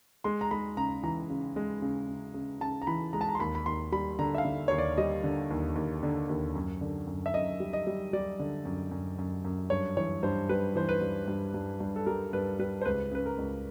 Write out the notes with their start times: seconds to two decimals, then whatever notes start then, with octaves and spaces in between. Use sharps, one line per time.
0.24 G#3 C6
0.41 A#5
0.51 G#3 B5
0.77 C#3 A#5
1.03 E3 A#5
1.30 C#3
1.56 G#3
1.82 C#3
2.08 C#3
2.34 C#3
2.61 C#3 A5
2.82 A#5
2.87 E3 B5
3.13 G#3 A#5
3.21 A5
3.29 A#5
3.35 C6
3.40 D#2 B5
3.55 B5
3.66 D#2 C6
3.92 G3 B5
4.19 D3 A#5
4.35 E5
4.38 F5
4.45 D3
4.68 D#2 C#5
4.78 D5
4.98 G3 D#5
5.24 D3
5.51 D#2
5.76 D#2
6.03 D3
6.29 D#2
6.55 F#2
6.81 D3
7.07 F#2
7.26 E5
7.34 F#2 D#5
7.60 G3
7.73 D#5
7.87 G3
8.13 G3 D5
8.39 D3
8.65 F#2
8.91 F#2
9.18 F#2
9.44 F#2
9.70 G2 C#5
9.97 E3 C#5
10.23 G2 C5
10.49 G3 B4
10.75 E3 C5
10.89 B4
11.01 G2
11.28 G2
11.54 G2
11.80 G2
11.96 A4
12.06 G3 A#4
12.33 G2 B4
12.59 G3 B4
12.82 C5
12.85 C#2 B4
13.11 C#3 B4
13.26 A#4
13.38 C#2